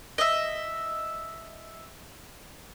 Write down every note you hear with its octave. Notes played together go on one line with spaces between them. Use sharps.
D#5 E5